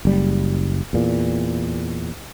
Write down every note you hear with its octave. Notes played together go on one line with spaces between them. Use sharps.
F#1 G3
E2 A#2